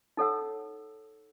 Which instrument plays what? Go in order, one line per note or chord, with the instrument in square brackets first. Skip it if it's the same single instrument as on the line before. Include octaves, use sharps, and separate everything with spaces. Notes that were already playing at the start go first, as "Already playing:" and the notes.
[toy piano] D#4 A4 C#5 F#5 E6